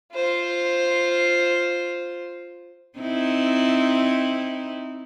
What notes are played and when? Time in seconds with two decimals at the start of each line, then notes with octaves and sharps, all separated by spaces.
0.13 F4 C5
2.99 C4 D#4 E4